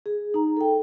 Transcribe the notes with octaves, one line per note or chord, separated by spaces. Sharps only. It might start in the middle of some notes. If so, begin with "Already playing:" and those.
G#4
D#4 A#5
A4 G5